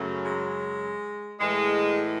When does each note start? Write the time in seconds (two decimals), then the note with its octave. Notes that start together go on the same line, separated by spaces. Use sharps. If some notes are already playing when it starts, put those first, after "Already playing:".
Already playing: F#2 C#3 F#3 A3
0.24 G#3
1.40 A2 E3 G#3